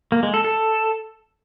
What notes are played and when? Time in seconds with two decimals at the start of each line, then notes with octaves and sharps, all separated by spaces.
0.12 A#3
0.23 G#3
0.34 A4
0.45 A4